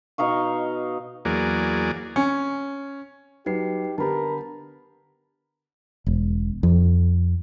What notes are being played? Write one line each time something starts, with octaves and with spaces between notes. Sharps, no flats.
B2 D#4 F5 C#6
E2 F#3 A#3 G#4 D5
C#4
F#3 D#4 G4 B4 C7
D3 B3 G4 A#4 A5 B5
E1
F2